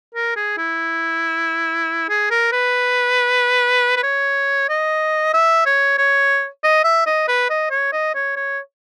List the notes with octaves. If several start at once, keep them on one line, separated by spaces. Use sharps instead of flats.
A#4
G#4
E4
G#4
A#4
B4
B4
C#5
D#5
E5
C#5
C#5
D#5
E5
D#5
B4
D#5
C#5
D#5
C#5
C#5